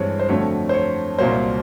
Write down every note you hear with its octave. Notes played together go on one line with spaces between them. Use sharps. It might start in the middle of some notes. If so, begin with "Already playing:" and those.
Already playing: G2 E3 G#3 C4 C#5
C5
F2 D3 F#3 A3 C#5
C5
C#5
C2 A#2 F#3 A#3 C5